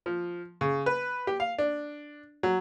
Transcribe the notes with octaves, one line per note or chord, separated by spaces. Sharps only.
F3
C#3
B4
G4
F5
D4
F#3